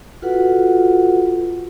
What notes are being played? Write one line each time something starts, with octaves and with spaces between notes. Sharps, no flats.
F4 F#4 A4 B4 F#5